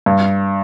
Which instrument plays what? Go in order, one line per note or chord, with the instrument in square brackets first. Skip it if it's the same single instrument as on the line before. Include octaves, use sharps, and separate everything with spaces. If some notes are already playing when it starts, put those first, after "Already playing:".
[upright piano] G2